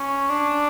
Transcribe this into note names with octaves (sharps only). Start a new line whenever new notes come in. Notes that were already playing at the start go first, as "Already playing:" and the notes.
Already playing: C#4
D4